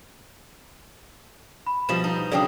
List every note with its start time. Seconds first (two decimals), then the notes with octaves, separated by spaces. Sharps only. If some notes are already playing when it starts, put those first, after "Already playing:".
1.67 B5
1.89 B2 F3 G3 E7
2.04 D#4
2.32 C#3 F#3 D4 D5 G5 D#6